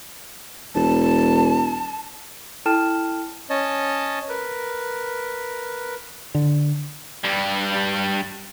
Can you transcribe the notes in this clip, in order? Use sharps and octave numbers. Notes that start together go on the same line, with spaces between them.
E1 A5
E4 A4 G5 A5 F6 E7
C#4 C#5 D#5 A5
A#4 B4
D3
G2 G3